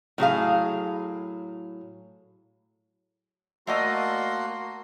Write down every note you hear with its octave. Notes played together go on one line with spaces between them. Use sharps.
A2 F#3 G#4 F5
A3 A#3 F#4 D5 D#5 C6